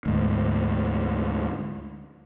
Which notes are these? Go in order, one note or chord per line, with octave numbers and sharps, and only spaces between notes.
D2 G#2